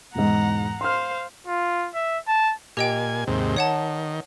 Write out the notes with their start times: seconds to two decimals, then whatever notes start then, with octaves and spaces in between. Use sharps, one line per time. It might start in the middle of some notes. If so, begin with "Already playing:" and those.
0.15 E1 G#2 F#5 A#5
0.81 C5 F5 C6 F6
1.47 F4
1.95 E5
2.28 A5
2.77 A#2 G4 D#5 G5 G#5
3.27 D#2 G#2 C3
3.56 D#3 C#5 F#5 A5